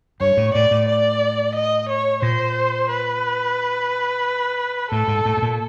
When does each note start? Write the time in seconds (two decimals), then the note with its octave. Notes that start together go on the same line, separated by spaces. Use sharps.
0.21 G2 C#5
0.37 A2
0.54 A2 D5
0.71 A2
0.88 D5
1.55 D#5
1.89 C#5
2.22 A#2 C5
2.90 B4
4.91 A2 A4
5.08 G#2
5.25 A2
5.37 A2
5.42 A#2